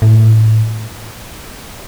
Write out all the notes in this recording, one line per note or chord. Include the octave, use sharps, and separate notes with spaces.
A2